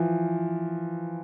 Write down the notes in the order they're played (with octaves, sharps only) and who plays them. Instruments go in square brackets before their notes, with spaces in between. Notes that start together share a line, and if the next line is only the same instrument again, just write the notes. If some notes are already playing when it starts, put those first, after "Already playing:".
Already playing: [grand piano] E3 F3